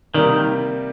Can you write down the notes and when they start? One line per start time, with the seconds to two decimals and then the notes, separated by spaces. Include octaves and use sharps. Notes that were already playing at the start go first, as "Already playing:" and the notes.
0.14 C3 D#3 G3 A#3